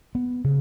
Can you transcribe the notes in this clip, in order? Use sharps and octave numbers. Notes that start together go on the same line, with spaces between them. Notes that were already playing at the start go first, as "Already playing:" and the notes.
B3
C#3